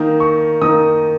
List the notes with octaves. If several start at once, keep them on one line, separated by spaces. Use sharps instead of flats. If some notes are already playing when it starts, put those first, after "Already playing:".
Already playing: D#3 A#3 D#4 A#5
C#6
D#3 A#3 D#4 D#6